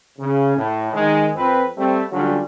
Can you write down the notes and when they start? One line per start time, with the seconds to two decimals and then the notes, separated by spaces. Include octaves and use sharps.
0.19 C#3
0.57 A2
0.93 D#3 G#3
1.36 F2 C4 B4
1.77 G3 A3 C4
2.12 D3 F#3 G3 C#4 F4 F#4